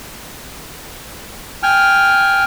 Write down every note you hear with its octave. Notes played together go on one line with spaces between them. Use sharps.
G5 G#5 F6